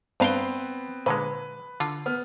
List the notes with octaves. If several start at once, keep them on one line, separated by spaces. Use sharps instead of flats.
G2 B3 C4 B4 F5 G5
A#2 D3 G#3 B4
D3 F4
B3 F6